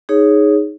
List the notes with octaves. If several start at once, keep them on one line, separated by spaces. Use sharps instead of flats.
D#4 G#4 C#5